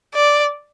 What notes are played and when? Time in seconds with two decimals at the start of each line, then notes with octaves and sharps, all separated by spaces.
0.14 D5